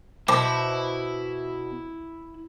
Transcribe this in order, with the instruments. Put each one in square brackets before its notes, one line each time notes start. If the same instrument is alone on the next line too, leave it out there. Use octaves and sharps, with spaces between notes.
[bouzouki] B2 [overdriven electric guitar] E4 E5 [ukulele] C5 A5 [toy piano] D6